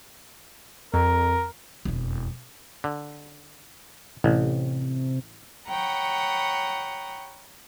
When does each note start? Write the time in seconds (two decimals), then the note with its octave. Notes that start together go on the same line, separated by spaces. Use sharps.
0.94 F2 A#4
1.85 E1 F2
2.84 D3
4.24 A1 C3
5.69 C#5 F#5 G5 A#5 B5 D#6